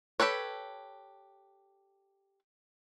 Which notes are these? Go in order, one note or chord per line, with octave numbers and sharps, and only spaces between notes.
G4 A4 B4 C#5